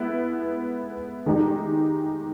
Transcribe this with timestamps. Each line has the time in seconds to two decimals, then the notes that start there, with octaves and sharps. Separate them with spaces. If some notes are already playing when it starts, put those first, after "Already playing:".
Already playing: G#3 B3 E4
1.26 D#3 G#3 D#4 G4